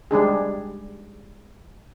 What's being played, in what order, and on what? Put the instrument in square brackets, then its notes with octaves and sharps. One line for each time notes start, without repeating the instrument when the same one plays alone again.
[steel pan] G3 G#3 D4 G#4